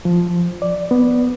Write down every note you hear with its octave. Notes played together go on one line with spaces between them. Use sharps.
F3
D5
B3